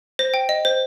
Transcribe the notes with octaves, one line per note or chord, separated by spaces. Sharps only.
C5 A#6
G5
D#5
C5